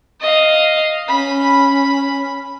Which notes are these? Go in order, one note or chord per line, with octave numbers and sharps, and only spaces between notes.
D#5 F5
C#4 B5